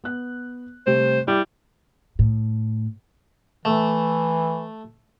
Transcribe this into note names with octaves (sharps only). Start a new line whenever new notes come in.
B3 F#6
C3 G3 A3 C5
G3 E4 D5 D6
A2
E3 A3